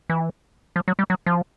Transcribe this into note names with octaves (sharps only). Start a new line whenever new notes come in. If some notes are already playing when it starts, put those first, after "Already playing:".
E3
F3
F#3
G3
F#3
F3